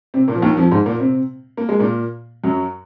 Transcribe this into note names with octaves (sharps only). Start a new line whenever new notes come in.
C3 C4
A#2 A#3
F3
D#2 D#3
F2 F3
G#2 G#3
A#2 A#3
C3 C4
A#3
G#3
A#2 A#3
F#2 F#3